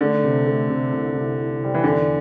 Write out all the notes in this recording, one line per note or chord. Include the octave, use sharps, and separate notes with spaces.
D3 A3
C3
A3
C3
C2
C2
E4
C3 G3
E3
E2 D3